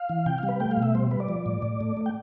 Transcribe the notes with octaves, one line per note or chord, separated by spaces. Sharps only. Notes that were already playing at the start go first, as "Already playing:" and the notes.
Already playing: F5
E3
C3 G5
G3 F5
B4
A3 G5
F5
B2
E5
G3 C5
G3 B4
D5
F3
A2
A2
A3
A3
G5